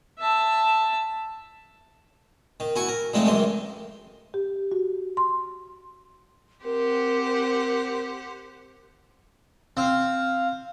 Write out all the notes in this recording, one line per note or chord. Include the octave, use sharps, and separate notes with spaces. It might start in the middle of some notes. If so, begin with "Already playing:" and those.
E5 A5
D#3
E4 F#4 G#5 C#6
A#4
A#2 G#3 A3 C4 D#4
C#2 F#2 D#3 E3 C6
G4
F#4
C6
C4 G4 A#4 C5 F#5
C4 F5